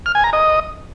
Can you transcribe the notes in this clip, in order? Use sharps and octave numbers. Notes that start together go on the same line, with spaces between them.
F6
G#5
A#5
D#5